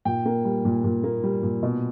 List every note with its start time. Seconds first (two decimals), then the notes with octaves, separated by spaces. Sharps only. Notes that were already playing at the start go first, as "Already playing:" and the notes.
0.05 A#2 G5
0.25 A#3
0.45 G3
0.65 A#2
0.84 A#2
1.04 A#3
1.24 G3
1.43 A#2
1.63 B2